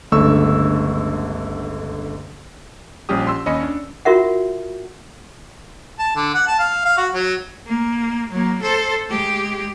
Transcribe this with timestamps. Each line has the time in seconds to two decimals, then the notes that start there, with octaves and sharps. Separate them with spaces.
0.12 G1 C#2 D3 A3 C#6 E6
3.09 A#1 G3 C#4 G4 D#6
3.27 C6 E6
3.46 D#2 C#4 D#5 B5 C#7
3.63 D4
4.05 F4 F#4 A#4 E5 F#5
5.99 A5
6.16 D3
6.34 F#5
6.47 A5
6.59 F5
6.85 F5
6.97 F#4
7.14 F#3
7.67 A#3
8.31 F#3 A#3
8.62 A4 C5
9.09 G#3 G4